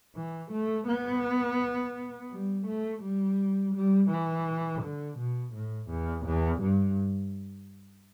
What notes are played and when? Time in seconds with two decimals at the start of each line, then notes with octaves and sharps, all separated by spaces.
0.16 E3
0.52 A3
0.88 B3
2.31 G3
2.67 A3
3.03 G3
3.74 G3
4.10 E3
4.82 D3
5.18 B2
5.54 A2
5.90 E2
6.26 E2
6.61 G2